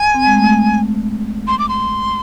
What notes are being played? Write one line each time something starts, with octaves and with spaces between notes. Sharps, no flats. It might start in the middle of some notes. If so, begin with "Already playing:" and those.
Already playing: G#5
C4
G#3
A3
C6
D6
C6